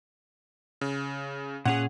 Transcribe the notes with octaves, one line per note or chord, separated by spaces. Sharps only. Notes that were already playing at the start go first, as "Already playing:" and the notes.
C#3
A#2 C#4 G#4 F#5